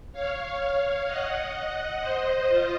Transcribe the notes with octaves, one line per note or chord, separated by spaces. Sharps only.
C#5 F5
D#5 F#5
C5 D#5
F4